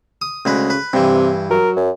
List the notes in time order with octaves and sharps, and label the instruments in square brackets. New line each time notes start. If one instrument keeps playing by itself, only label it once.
[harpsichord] D#6
[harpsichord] D2 G#3 B4 [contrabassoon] C#3
[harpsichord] B4
[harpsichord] G2 E3 [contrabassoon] C3
[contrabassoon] F#3 [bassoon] A#4
[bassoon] F#2